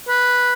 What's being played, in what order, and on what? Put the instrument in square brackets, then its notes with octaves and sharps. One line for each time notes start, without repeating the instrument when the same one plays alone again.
[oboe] B4